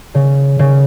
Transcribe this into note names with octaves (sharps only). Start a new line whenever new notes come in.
C#3
C#3